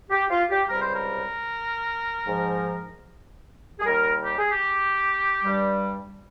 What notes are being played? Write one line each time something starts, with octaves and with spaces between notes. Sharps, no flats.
G4
F4
G4
C#2 C3 G3 A#4
C5
A#4
G#2 F3
G#4
D#2 D#3 G3 A#4
G4
G#4
G4
G2 G3